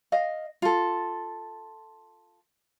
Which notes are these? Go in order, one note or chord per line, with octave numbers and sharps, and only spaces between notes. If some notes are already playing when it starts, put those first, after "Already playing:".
D#5 F5
F4 A4